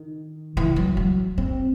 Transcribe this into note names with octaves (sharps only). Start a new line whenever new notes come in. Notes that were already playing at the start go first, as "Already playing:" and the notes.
Already playing: D#3
E3
F#3
F#3
C4